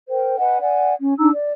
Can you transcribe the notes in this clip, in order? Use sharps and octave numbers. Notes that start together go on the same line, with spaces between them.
A#4 C5 G5
B4 D#5 F#5 G#5
D5 F#5 G#5
C#4
D4 D#4 A#5 E6
D5